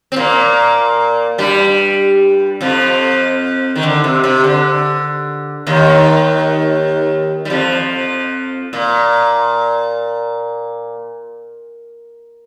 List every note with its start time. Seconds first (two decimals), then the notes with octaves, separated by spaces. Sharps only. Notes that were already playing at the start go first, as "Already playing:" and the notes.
0.12 C4
0.16 A#2 A#3
1.38 G2 G3
2.61 F2 F3
3.75 D#3
3.83 D3
4.04 C3
4.24 C3
4.44 D3
5.67 D#2 D#3
7.45 G3
7.50 F2 F3
8.73 A#2